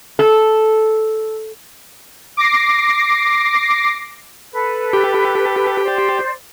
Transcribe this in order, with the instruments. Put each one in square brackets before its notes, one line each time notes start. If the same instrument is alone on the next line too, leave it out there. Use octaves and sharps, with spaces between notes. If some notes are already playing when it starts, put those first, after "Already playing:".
[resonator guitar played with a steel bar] A4
[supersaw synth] D6 A#6 C7
[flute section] A4 B4
[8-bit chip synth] G4
[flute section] C5 D5